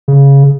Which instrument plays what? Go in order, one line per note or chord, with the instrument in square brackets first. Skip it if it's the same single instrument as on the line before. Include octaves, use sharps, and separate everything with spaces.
[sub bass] C#3